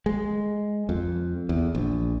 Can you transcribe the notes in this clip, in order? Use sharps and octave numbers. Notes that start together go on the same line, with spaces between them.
G#3
F2
E2
A#1